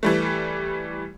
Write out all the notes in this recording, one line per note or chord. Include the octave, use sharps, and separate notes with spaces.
E3 G3 A3